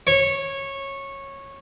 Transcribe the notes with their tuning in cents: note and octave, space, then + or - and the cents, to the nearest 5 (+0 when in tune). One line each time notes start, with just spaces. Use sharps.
C#5 -15